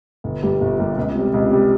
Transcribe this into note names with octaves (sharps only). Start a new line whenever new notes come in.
G1
G2 G3 A#3
G1
G2 G3 A#3
C#2
C3 G3
C#2
C3 G3